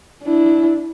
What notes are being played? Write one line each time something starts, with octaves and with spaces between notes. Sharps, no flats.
D4 E4